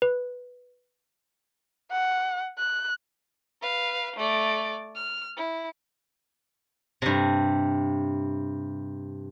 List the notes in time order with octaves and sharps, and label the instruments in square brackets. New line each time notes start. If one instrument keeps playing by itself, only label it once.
[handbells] B4
[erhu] F#5
F#6
[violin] B4 F5
A3 D5
F6
E4
[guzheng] G2 C3